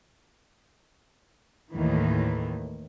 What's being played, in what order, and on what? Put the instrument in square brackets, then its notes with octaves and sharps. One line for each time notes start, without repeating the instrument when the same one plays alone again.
[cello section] D#2 A2 D#3 E3